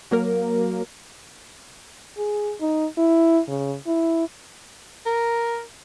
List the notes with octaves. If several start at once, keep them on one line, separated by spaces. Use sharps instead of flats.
F#3 A#3 A#4
G#4
D#4
E4
C#3
E4
A#4